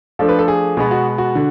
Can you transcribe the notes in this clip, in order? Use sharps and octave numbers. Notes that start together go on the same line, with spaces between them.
F3 A3 D4 A4
B4
A4
G#4
B2 G#3 B3 G#4
F#4
F#4
D3